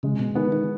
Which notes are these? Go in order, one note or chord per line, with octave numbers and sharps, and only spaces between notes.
C#3 G#3
B2
D#3 B3
D#3